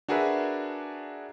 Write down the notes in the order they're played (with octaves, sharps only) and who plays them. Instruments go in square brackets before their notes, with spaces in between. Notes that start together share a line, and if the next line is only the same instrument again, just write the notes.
[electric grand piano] D4 F#4 G#4 A#4 B4 E5